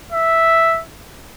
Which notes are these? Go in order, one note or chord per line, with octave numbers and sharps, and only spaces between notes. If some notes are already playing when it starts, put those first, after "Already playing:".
E5